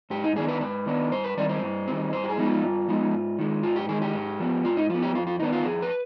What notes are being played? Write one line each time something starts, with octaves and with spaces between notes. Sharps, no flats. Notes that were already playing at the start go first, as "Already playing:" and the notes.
G#2 G4
D#4
D#3 B3 D4 G#4
B4
G#2 B4
D#3 B3 D4
G2 C5
B4
D#3 G3 C4 D5
C5
G2
D#3 G3 C4
G2 C5
G4
G#4
F3 G#3 B3 D#4
F4
G2
F3 G#3 B3 D#4
G#2
D#3 G#3
G#2 F4
G4
D#3 G#3 G#4
G4
G#2
F3 B3
G#2 F4
D#4
F3 B3 F4
G4
F2 F4
F4
D#3 B3 D4 D#4
F4
F2 G#4
B4